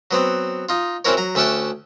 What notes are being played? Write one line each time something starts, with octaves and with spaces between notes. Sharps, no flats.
F#3 B3 C4
D#4 F4
C4 C#4 E4 F#4 A#4 C#5
F#3 A#5
D2 C#4 E5 F#5 G5 A5